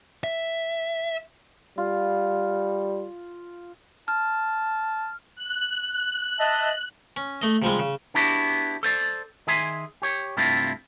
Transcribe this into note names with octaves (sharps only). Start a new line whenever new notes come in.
E5
G3 F4
A5 F6
F#6
D#5 E5 A5
C#4
A3 D#5
C3 F3 G3 G#3
C#3
B3 D4 E4 F#4 G4
A4 C5 D5
D#3 G#4 E5 G#5 C6
G4 C#5
G2 C3 A3 C4 E4 F4